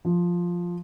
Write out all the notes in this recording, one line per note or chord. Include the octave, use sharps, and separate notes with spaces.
F3